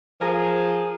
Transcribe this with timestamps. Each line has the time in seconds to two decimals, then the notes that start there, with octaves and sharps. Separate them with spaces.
0.21 F3 G#4 A#4 G#5